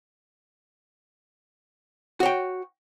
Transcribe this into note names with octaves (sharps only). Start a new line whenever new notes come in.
F#4 C#5 G5